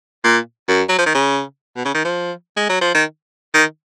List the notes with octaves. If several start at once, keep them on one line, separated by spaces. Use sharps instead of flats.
A#2
F#2
F#3
F3
D#3
C#3
B2
C#3
D#3
F3
G#3
F#3
F3
D#3
D#3